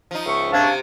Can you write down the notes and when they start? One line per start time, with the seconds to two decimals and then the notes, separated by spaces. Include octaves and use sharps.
0.11 F3 D#4
0.26 C#2 E5 C#6
0.53 C3 C4 D4 F5 G#6